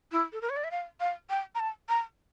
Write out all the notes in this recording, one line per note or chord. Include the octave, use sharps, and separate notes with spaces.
E4
A4
A#4
C#5
D5
E5
F5
F5
G5
A#5
A5
A#5